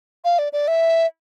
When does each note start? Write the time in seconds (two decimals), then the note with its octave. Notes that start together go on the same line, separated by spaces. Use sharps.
0.24 F5
0.39 D5
0.53 D5
0.68 E5